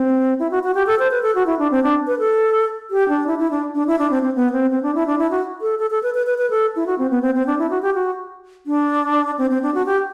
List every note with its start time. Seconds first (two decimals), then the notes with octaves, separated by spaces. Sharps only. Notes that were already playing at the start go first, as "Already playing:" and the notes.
Already playing: C4
0.39 E4
0.51 F#4
0.63 F#4
0.75 G4
0.87 A4
0.99 C5
1.11 B4
1.22 A4
1.35 F#4
1.46 E4
1.59 D4
1.71 C4
1.83 D4
2.07 B4
2.19 A4
2.91 G4
3.09 D4
3.27 E4
3.39 E4
3.51 D4
3.75 D4
3.87 E4
3.99 D4
4.11 C4
4.22 C4
4.35 B3
4.53 C4
4.70 C4
4.83 D4
4.95 E4
5.07 D4
5.18 E4
5.31 F#4
5.61 A4
5.79 A4
5.90 A4
6.03 B4
6.14 B4
6.26 B4
6.38 B4
6.50 A4
6.76 E4
6.86 F#4
6.98 C4
7.10 B3
7.22 C4
7.35 C4
7.47 D4
7.58 E4
7.70 F#4
7.82 G4
7.94 F#4
8.66 D4
9.38 C4
9.50 C4
9.62 D4
9.74 F#4
9.86 G4